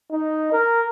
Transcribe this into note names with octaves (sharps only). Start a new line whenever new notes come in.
D#4
A#4